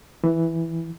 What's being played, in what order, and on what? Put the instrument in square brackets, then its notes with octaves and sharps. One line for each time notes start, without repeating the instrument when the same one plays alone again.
[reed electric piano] E3